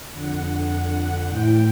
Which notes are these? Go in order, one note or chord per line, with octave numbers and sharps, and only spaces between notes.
F2 D3 F#5
A2 E3 G5